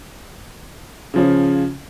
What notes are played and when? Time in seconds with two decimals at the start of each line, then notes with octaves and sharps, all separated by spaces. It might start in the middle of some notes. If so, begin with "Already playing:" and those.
1.14 C#3 F3 C#4